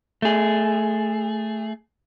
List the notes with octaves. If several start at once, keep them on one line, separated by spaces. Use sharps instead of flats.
A3 G#4